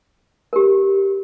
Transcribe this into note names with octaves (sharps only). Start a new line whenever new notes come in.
G4 A#4